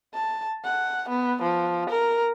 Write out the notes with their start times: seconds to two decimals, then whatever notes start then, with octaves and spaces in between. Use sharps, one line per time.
0.14 A5
0.65 F#5
1.09 B3
1.42 F3
1.90 A#4